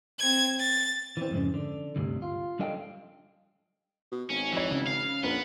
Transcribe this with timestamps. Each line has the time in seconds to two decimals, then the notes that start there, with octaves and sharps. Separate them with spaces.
0.19 C4 G#6
0.59 A6
1.17 E3 C4
1.31 F2 G#2 C#3
1.54 D3
1.96 D2 G2 C3
2.22 F4
2.59 G3 D4 A4 D#5 F5 G5
4.11 B2
4.30 G#1 C#4
4.53 E3 F3 C#5
4.71 C#3
4.87 F5
5.23 A#1 B3 C#4 A#4 B4